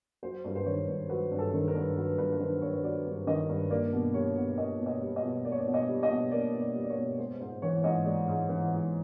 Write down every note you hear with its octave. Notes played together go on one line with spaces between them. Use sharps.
F#3 C5
G2 B4
C5
D#3 C#5
G2
F#3 B4
G2
A4
D#3
A#4
G2
F#3 B4
G2 B4
B4
D#3 C5
G2 C#5
C#5
F#3 D5
G2
D#3 D#5
G2
A#3 D5
B2
G3 C#5
B2
A#3 D#5
B2
D#5
G3
D#5
B2
A#3 D5
C#5
D5
B2
D#5
G3
D#5
B2
A#3 D5
B2
D5
G3
D5
C#5
B2
G#3 C5
G#2 C5
E3 C#5
G#2 D#5
G#3 D5
G#2
E3
G#2